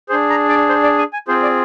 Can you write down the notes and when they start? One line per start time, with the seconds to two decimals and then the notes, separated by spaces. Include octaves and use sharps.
0.09 D4 G#4 C5
0.30 A#5
0.49 D5
0.69 C5
0.83 D5
0.98 G#5
1.13 G#5
1.28 C4 F4 G#4 C5
1.43 D5